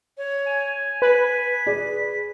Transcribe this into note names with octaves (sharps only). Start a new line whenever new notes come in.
C#5
G#5
B4 B6
G#4 D5